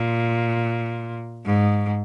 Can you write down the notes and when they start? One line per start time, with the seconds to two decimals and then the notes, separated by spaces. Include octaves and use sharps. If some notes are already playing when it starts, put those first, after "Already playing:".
Already playing: A#2
1.45 G#2